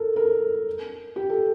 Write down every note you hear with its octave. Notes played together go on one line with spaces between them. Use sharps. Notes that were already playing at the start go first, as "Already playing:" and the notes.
Already playing: A4 A#4
A#4
G4
A4